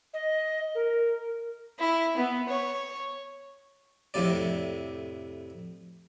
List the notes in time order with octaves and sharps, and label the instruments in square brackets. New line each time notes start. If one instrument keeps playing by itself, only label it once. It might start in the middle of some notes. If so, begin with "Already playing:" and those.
[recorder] D#5
A#4
[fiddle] E4
B3
C#5
[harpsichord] F2 A2 C3 D5